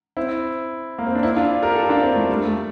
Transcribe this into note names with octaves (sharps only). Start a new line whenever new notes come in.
C4 E4
A#3
C4
D4
C4 E4
D4 F4
G4 A#4
F4 A4
D4 F4
C4 E4
A3
G3
A3